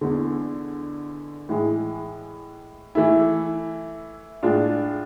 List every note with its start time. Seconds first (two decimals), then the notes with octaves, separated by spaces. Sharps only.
0.01 E2 D3 G#3
1.49 A2 E3 G#3
2.95 E3 A3 E4
4.43 A2 G#3 D4 F4